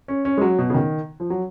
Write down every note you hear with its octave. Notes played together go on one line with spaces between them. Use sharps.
C#4
C#4
G#3
F#3
B2
C#3
D#3
F3
F#3